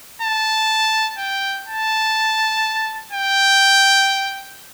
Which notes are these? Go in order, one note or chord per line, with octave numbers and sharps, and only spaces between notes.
A5
G5
A5
G5